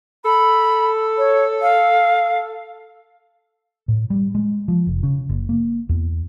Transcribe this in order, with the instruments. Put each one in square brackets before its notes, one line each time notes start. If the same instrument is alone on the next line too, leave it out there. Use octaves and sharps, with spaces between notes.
[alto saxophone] A4 [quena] B5
[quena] C#5
F5
[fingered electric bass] A2
G3
G#3
F3
F1
C#3
F#1
A#3
E2